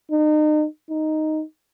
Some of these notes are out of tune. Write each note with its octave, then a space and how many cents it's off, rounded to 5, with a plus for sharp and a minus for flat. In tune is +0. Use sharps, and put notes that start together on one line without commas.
D#4 -35
D#4 +0